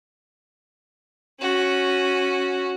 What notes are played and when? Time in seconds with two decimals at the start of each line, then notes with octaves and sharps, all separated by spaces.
1.40 C#4 F#4